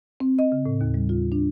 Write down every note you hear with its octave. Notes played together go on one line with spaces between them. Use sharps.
C4
D#5
C#3
A2
D#2
G3
F4
D4